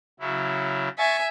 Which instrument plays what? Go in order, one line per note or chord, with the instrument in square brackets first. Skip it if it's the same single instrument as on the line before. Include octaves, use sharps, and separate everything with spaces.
[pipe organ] C#3 F#3 E4
[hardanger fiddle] E5 G#5 [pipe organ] C#6 A6